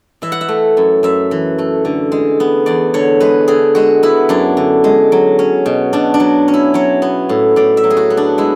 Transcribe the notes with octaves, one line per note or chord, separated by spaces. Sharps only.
E3 E5
F#5
E5
A3
F#2
F#2 E5
E3
A3
D3
G#3
B3
E2 D5
D3 C#5
G#3 B4
D3 G#4
G#3 F#4
B3 E4
F#2 D4
D3
G#3
F#3
C#4
B2
B2 D4
D4
F#3
C#4
E4
F#3 C#5
B3
A2
A2 D5
E5
F#3
G#4
F#4
B3
D4
G#3 E4